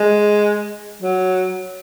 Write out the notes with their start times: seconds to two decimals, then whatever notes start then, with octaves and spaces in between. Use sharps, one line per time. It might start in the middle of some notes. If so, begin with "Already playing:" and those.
Already playing: G#3
1.02 F#3